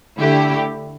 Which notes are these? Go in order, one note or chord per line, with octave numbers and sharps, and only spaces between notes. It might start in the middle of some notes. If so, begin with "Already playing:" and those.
D3 A3 E4 G4